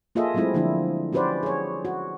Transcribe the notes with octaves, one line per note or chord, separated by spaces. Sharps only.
A#3 F4 G#4 A4 D#5 E5
F#3 G#3 A3 C4 E4 F4
D3 F3 A#3 D4 E4
C#4 F#4 G4 B4 C5 D5
G#4 C#5
F#4